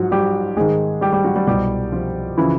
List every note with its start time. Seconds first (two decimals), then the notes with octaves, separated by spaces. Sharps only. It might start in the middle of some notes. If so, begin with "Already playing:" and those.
Already playing: G#2 F3 F#3 F#4
0.11 G3 G4
0.57 G#2 D#3 G#3 G#4
1.01 G3 G4
1.13 G3 G4
1.24 F#3 F#4
1.36 G3 G4
1.47 C2 B2 G3 G4
1.92 F3 F4
2.38 C#3 E3 F3 E4